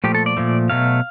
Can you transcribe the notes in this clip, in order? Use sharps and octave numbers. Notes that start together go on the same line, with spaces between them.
A#2 F3 A3 G4
A4
D5
A#2 F3 A3
B2 F#3 A3 F5